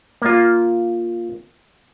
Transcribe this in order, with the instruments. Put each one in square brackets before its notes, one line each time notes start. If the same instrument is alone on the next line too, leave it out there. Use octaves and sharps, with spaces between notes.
[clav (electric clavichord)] A#3 F4